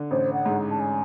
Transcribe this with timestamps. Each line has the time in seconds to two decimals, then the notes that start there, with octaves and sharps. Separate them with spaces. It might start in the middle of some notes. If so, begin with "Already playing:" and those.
Already playing: D3
0.11 A1 C5
0.33 F#5
0.46 G#2
0.71 A5
0.80 G#5